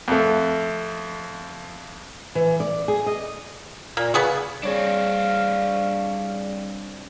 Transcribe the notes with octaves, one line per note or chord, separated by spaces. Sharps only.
F2 A3
E3
D5
G#4
D#5
A#2 A#3
C#3 B3 G#4 C#6
G3 C4 D4 G#4 C#5 D5 F5